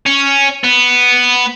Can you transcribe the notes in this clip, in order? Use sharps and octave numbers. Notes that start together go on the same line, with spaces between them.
C#4
B3